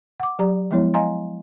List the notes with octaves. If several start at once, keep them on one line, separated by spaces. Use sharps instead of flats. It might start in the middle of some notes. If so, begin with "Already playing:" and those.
F#5 D6
F#3 G4 D5 A#5
F3 G#3 B3 E4 C#5
D#5 F5 G#5 A#5 C6